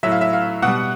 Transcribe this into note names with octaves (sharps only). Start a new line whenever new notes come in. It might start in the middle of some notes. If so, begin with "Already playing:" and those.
A2 F#3 E5
F5
E5
F5
B2 G3 F#5